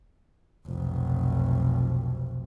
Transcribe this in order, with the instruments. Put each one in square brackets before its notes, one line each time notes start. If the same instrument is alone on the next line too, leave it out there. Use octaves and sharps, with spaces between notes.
[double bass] F1 B1